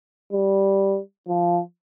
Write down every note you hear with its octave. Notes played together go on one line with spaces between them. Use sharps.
G3
F3